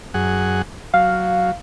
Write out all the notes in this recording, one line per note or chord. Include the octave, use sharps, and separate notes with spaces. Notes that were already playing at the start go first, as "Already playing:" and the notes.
F#2 G#4 F#5
F#3 F5